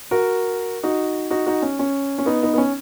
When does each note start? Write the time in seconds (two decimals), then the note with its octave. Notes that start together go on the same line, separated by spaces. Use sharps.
0.11 F#4 A#4
0.83 D#4 F#4
1.31 D#4 F#4
1.46 D#4 F#4
1.62 C#4
1.79 C#4
2.19 C#4
2.26 B3 D#4
2.43 B3 D#4
2.54 B3
2.58 C#4